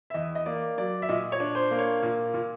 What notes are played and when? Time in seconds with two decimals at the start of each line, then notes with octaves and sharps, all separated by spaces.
0.10 E5
0.14 E2 D#5
0.35 D#5
0.46 A#3 D5
0.78 F#3 D5
1.02 E5
1.09 A#2 D#5
1.32 C#5
1.40 D4
1.55 C5
1.71 A#3
1.78 C#5
2.02 A#2
2.34 A#2